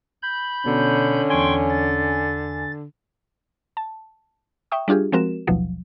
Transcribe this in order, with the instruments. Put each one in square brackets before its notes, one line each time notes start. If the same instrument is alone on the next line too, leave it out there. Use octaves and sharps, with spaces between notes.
[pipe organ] B5 G6
[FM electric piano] B2 [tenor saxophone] D3 [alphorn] C#4
[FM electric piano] E2 G#5 [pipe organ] G5 C6 C#6
[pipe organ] A6
[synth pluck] A5
E5 G5 C#6 D#6
G3 D4 F4 G4 G#4
F3 G#3 C4 F#4 A#4 E7
A1 D#2 B2 F3 F#3